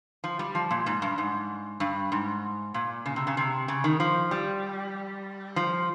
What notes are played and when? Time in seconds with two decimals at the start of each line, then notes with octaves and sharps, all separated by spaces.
0.24 F3
0.39 G3
0.55 F3
0.71 A#2
0.86 G#2
1.02 G2
1.18 G#2
1.80 G2
2.12 G#2
2.74 A#2
3.06 C#3
3.16 C3
3.27 C#3
3.37 C3
3.68 C#3
3.84 D#3
4.00 F3
4.31 G3
5.56 F3